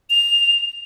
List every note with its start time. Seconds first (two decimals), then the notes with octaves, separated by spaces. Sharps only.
0.10 F7